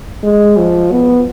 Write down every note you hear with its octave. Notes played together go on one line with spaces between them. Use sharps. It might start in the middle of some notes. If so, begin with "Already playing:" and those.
G#3
F3
B3